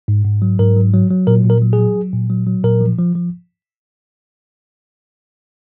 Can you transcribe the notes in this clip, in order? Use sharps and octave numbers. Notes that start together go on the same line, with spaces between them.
G#2
G#2
F#3
G#2 A#4
F#3
F#3
F#3
A#2 A#4
A#2
A#4
F#3
G#4
F#3
F#3
A#2
F#3
F#3
A#2 A#4
F3
F3
F3